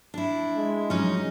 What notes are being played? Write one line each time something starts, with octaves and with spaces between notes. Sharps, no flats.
D4 E4
G#3
F3 F#3 C#4 D#4